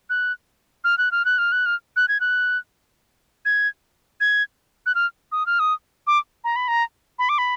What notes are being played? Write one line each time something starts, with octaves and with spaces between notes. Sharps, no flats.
F#6
F6
F#6
F6
F#6
F6
F#6
F6
F#6
G#6
F#6
G#6
G#6
F#6
F6
D#6
F6
D#6
D6
A#5
B5
A#5
B5
D6
B5